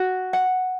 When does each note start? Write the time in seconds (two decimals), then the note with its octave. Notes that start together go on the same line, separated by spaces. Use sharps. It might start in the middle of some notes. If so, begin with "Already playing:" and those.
Already playing: F#4
0.33 F#5